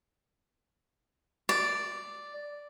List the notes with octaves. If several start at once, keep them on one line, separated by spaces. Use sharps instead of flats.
D5